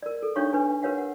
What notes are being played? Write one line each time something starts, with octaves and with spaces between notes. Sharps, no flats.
A#4 D5
A4
D4 D#4 G4 C#5 F5 C#6
D4 B4 G#5
G4 A#4 B4 C#5 F5 F#5
F#5